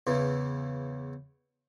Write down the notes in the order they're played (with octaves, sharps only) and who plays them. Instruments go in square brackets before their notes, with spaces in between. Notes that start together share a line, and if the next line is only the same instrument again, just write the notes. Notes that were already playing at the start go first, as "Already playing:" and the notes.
[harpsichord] E2 C#3 E3